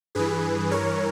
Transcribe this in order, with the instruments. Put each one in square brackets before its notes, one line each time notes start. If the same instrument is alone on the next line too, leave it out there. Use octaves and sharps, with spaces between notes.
[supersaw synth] G2 E3 G#4 B4
A#4 C#5